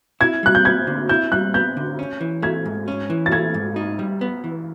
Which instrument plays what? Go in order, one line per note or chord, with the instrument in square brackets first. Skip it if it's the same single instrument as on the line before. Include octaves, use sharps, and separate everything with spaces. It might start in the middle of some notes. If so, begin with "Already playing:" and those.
[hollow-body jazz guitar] E4 [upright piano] G#6
[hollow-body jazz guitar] G3 [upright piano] F#6
[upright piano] G6
[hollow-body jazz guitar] B3 [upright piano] G#6
[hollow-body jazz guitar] D3
[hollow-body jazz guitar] E4 [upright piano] G6
[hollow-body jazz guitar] G3 [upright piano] F#6
[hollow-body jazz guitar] B3 [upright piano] G6
[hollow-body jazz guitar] D3
C#4
E3
[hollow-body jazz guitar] A3 [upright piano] G#6
[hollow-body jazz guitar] G#2
C#4
E3
[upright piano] A6
[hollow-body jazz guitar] A3 [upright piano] G#6
[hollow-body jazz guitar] G#2
D#4
G3
B3
E3